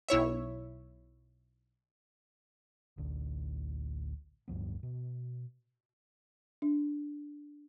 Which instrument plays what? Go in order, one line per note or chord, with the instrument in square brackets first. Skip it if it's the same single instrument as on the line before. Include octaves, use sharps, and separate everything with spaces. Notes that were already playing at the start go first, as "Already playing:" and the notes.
[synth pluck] B1 E4 C#5 E5
[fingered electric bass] A1 D2
D1 G2 F3 B3
B2
[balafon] D4